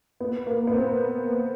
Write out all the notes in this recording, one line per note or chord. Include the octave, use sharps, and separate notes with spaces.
B3
A#3
B3
C4